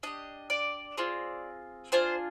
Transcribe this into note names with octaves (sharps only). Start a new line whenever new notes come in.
D4 G4 D#5
D5
C4 F4 G#4
D4 F4 G#4 C5